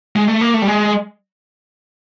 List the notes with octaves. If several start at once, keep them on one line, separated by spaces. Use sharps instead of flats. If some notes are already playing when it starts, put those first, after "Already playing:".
G#3
A3
A#3
A3
G3
G#3